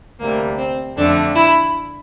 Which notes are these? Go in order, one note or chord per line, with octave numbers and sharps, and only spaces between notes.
D2 C3 G3 A#3
C4
F2 D3 A3 D4
E4